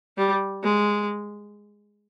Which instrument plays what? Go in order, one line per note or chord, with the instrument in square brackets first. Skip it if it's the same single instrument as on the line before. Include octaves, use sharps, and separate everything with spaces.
[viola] G3
G#3